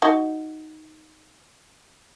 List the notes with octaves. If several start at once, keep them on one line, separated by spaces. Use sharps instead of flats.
D#4 F#4